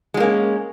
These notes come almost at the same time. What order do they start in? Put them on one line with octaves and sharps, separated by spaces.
G#3 F#3 A#3 C#4